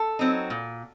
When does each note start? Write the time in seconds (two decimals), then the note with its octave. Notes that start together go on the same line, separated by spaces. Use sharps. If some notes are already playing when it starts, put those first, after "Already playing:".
Already playing: A4
0.19 F#3 C4 D#4
0.50 A#2